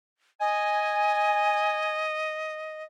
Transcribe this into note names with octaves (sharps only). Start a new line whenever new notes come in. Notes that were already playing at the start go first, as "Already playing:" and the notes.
D#5 G#5